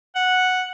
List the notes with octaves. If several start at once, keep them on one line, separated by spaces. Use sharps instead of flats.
F#5